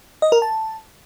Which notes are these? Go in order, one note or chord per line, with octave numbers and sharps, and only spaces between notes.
D#5
A#4
A5